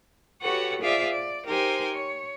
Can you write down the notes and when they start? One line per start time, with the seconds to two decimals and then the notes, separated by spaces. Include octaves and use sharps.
0.40 F#4 G4 A4 B4 C#5 F#5
0.81 F4 G#4 C5 D5 E5 F5
1.12 D5
1.46 D#4 G4 A#4 C5 G#5 C6
1.94 C#5